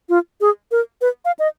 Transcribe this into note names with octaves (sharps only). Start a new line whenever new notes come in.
F4
G#4
A#4
B4
F5
D#5